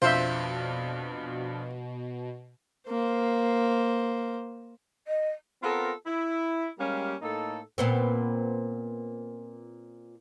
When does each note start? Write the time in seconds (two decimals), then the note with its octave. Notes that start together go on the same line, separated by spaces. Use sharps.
0.02 F2 B2 F3 D4 F4 C5 E5
2.89 A#3 C5
5.07 D#5
5.62 B3 C4 F4 A4 A#4
6.06 E4
6.78 G3 G#3 A#3 C#4 G4 F5
7.22 A2 A#3 D#4 A4
7.78 A#2 B3 C4